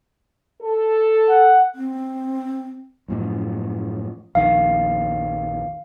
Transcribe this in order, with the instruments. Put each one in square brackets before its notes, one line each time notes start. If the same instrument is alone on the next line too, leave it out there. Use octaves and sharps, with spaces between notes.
[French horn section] A4
[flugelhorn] F#5
[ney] C4
[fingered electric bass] F#2 A2 F3
[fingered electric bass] A#1 F2 D#3 [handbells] F5